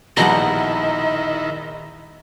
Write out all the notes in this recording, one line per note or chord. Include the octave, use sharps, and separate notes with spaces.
A#1 B2 D#3 G3 E4 D#5 F#5 A#5